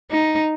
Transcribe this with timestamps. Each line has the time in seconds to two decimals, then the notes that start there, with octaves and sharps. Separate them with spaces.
0.11 D#4